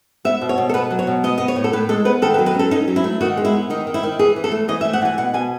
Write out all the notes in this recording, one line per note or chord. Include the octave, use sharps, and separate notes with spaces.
B3 E5
B2
C#5
B2
A4
B3 B4
F#3
C#5
B2
B3 D#5
B3 D#5
C#5
A2
A4
A2 B4
G#3 A4
B3 B4
D#3 A4
B4
F#3
B4
C#4 A4
C#4 D#4
F#3
E4
A3
D#3 F#4
G#3
E4
B3
D#3 D#4
D#3
E4
D#3
E3 G#4
E3
A4
A3
E3 D#5
E5
A3
F#5
E3 G#5
B2 F#5
B2 G#5